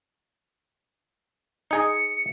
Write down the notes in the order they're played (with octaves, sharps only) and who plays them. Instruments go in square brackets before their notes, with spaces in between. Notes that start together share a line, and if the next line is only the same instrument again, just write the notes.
[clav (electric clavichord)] D#4 G#4 D#5 [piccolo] C#7